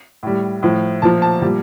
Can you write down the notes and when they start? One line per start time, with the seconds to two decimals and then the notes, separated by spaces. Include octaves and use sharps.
0.23 A2 G3
0.63 A2 F3
1.02 A#2 F3 A5
1.22 A5
1.41 A#2 G3